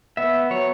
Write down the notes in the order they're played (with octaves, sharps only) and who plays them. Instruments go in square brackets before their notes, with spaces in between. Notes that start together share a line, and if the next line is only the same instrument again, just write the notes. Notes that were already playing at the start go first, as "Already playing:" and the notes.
[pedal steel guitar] B3 E5
F#3 C#5